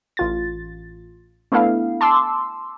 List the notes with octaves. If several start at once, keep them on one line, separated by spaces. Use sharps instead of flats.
A1 F4 A6
A3 B3 D4 E4 A4 F5
A5 C6 D6 E6